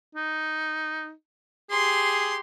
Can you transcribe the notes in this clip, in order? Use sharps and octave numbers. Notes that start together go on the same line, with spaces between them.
D#4
G4 G#4 C6